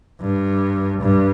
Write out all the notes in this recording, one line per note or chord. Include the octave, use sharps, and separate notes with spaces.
G2
G2